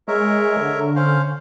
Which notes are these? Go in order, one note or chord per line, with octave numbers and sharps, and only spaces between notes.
G#3 A#4 C#5 E5
D3
C#4 C5 F5